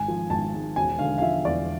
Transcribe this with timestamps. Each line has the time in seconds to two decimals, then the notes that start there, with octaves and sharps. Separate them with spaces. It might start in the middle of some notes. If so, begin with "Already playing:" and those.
Already playing: G#1 G#5
0.08 F3
0.30 G#1 A5
0.54 G#2
0.76 E1 G#5
0.99 D3 F5
1.18 F5
1.21 F3 E5
1.45 E2 D5